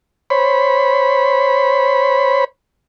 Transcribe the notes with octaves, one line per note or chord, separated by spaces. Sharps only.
C5 C#5 B5